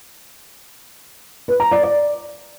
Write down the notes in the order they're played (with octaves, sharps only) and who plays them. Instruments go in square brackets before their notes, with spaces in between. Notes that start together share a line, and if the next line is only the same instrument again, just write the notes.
[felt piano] B4
A#5
D5
D5